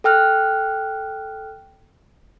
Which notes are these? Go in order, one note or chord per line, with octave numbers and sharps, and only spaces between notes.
A4 G5 F6 F#6